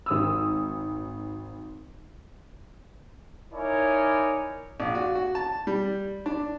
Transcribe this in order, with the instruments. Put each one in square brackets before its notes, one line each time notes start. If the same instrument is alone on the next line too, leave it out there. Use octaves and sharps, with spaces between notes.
[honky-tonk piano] G#1 D#6 E6
[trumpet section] D#4 E4 A#4 C#5 D5 G#5
[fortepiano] A#1
F#4
F#4
A5
G3
D4